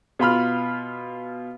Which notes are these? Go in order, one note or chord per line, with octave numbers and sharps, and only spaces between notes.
B2 F4 B5 F6